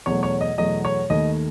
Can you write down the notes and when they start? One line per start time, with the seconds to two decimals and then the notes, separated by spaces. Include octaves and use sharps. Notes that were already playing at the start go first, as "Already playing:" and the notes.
0.06 E2 B2 F#3 A3 C#5
0.23 C#5
0.41 D#5
0.58 E2 B2 F#3 A3 D#5
0.85 C#5
1.10 D#2 D#3 A3 D#5